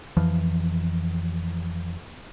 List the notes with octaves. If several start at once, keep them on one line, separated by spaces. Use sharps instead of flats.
F2 E3 F3